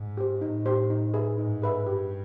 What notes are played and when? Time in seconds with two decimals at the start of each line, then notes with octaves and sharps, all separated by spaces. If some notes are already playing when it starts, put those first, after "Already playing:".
Already playing: G#2
0.17 G4 C5
0.41 A2 D#4
0.66 G4 C5
0.90 D#4
1.14 G#4 B4 E5
1.38 G#2 D#4
1.62 G#4 B4 E5
1.86 G2 G4